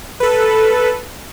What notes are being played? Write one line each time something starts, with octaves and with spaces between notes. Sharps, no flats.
A4 B4